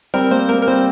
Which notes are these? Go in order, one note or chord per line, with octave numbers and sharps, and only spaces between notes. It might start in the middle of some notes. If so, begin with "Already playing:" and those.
G3 C4 A#4
A#3 C5
A#3 A#4
A#4
G3 C4 C5